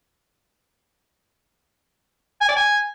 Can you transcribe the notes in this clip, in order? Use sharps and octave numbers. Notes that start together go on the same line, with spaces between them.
G#5
D5
G#5